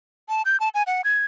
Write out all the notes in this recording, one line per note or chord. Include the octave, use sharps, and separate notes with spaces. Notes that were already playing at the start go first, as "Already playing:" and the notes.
A5
G6
A5
G#5
F#5
G#6